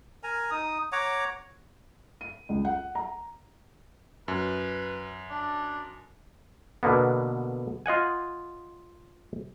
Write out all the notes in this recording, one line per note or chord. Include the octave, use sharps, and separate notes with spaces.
A#4 G#5 A#5
D#4 D#6
C#5 F#5 A#5 D6
D#7
C#2
F#5
A#5
F#2 B4
D4
B2 D3 A#3 B3
F4 D#5 F#5 G#5